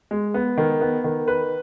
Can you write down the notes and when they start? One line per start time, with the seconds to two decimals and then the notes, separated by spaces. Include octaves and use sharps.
0.11 G#3
0.34 B3
0.58 D#3
0.81 B3
1.04 D#3
1.28 B4